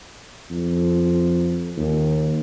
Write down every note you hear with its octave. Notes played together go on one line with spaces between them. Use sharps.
F2
D#2